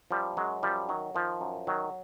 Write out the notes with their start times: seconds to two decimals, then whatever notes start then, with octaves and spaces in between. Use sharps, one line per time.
0.11 F#2 F3 G3
0.37 F#2 F#3 G#3
0.63 F#2 F3 G3
0.89 D#3 F#3
1.15 D#3 F3
1.41 F#2
1.67 D#3 F#3